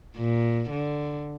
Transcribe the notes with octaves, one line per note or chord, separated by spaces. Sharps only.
A#2
D3